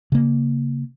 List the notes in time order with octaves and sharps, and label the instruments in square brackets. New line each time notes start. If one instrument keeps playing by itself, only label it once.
[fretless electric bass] C#3 A#3